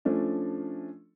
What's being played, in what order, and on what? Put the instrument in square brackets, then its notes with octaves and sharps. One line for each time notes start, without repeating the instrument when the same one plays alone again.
[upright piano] F3 A3 C#4 D4